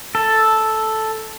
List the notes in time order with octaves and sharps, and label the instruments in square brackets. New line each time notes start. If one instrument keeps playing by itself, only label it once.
[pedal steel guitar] A4